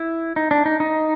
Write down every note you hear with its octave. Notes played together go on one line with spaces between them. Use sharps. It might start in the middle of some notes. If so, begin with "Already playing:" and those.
Already playing: E4
D#4
D4
D#4
D#4